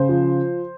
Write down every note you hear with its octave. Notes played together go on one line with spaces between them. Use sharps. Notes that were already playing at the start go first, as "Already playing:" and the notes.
Already playing: C#3 C5
F3